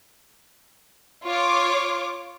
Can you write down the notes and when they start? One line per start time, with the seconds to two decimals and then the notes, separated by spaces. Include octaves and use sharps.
1.24 F4 C#5 D6